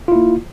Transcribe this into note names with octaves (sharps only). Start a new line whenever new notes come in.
A#3 E4 F4